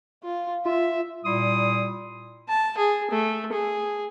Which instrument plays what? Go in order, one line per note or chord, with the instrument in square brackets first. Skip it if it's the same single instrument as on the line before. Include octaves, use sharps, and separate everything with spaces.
[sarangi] F4
[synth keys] F4 [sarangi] E5
[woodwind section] A#2 G3 E4 C6 D#6
[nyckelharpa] A5
G#4
A3
G#4